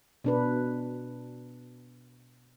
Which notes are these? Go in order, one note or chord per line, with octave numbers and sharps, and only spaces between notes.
B2 D4 B4